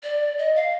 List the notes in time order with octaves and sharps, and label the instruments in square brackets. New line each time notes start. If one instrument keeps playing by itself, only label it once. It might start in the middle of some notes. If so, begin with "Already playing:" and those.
[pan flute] D5
D#5
F5